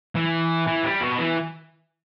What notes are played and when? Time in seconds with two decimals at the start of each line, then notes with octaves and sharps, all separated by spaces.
0.15 E3
0.67 E3
0.84 G3
1.01 B2
1.18 E3